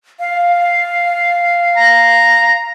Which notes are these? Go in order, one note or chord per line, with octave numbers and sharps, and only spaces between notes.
F5
A#5